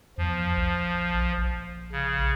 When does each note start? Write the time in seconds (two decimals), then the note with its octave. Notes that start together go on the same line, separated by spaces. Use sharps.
0.18 E2 F3
0.57 A#1
1.38 A#1
1.92 C#3